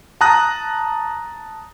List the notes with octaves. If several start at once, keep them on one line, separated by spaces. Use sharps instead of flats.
A5 A#5 D#6 F#6 A#6